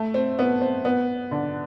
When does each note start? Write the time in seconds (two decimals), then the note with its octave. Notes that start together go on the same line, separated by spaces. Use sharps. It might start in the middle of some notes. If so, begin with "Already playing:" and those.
Already playing: A3
0.14 C4
0.39 B3
0.61 C4
0.85 B3
1.31 D3